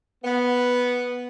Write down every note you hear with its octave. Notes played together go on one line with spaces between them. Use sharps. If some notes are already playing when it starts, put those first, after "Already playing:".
B3